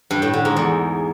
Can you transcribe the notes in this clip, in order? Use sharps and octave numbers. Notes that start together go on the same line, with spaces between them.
G2
A2
D3
G#2
E2